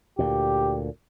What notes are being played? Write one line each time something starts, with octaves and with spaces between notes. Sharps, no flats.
D2 A#2 G4